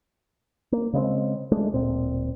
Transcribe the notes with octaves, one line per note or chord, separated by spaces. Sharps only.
A#3
C#3 G#3 B3 C4
G#3 A3 D4
D1 A#2 C4